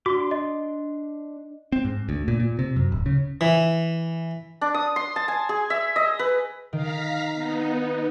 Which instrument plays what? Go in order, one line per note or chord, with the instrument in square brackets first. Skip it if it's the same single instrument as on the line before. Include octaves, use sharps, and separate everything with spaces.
[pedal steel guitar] D4 C6 D6 [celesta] F#4
[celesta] D#5
[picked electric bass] C4
G#2
D2
A#2
A#2
C3
F#2
D1
C#3
[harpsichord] E3
[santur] D4
D#6
C6
A5
G#5
G#4
E5
D#5
B4
[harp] D#3 [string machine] F5 A#5 B6
[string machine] B3 D#4